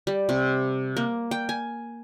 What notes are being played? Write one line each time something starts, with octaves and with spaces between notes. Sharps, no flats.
G3
C3
A#3
G5
G#5